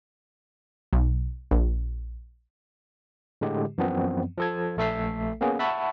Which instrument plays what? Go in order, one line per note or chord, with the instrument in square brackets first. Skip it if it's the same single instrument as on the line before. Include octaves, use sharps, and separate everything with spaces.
[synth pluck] B1
A#1
[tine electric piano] A2 D3 G#3 G4
F#2 E3 F3 B3 C4
F3 A4 G#6
A#1 A3 A4 E5 B6 C7
A#3 B3 C#4 G#4
E5 F#5 A5 B5 C#6